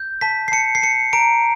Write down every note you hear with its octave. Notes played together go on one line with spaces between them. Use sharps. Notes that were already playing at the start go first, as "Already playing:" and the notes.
Already playing: G6
A5 B6
C7
A5 C#7
C7
A5 C#7
A#5 D7